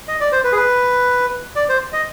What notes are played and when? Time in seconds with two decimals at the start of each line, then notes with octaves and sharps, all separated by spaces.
0.08 D#5
0.20 D5
0.32 C5
0.44 B4
0.52 G#4
0.56 B4
1.56 D5
1.69 C5
1.93 D#5